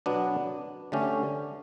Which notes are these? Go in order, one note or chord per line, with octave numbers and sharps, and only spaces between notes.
B2 F#3 B3 D4
D3 A3 C#4 G4